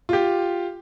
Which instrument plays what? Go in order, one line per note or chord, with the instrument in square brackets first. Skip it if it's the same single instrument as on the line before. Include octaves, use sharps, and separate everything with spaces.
[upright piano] F4 G4